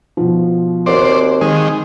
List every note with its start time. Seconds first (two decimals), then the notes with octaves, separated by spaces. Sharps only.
0.17 B2 F3
0.86 D#2 C4 F#4 C5 D5
1.41 D#3 G#3